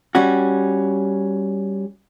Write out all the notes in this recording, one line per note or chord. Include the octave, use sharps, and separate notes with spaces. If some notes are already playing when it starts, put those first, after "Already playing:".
G3 C#4 F#4